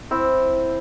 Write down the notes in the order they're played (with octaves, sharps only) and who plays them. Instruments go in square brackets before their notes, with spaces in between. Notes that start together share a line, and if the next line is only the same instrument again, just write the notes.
[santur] C4 E4 E6